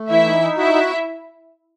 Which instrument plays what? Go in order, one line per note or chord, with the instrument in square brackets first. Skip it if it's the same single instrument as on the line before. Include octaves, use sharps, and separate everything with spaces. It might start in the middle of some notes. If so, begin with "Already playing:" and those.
Already playing: [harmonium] A3
[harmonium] E3 [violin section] E4 E5
[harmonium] D#4
D#4
[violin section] E4 E5 [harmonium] F#4
[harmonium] F#4